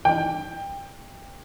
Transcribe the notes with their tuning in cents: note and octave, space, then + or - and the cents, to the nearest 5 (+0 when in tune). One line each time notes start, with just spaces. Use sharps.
G5 +20